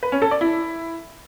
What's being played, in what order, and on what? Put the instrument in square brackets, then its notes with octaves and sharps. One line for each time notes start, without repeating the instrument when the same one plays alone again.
[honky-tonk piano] B4
C#4
A4
D5
E4